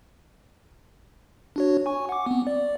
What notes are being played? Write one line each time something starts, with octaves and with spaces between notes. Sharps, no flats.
D4 F#4 C#5
G#5 C#6
F#5 D6
B3 C4
D5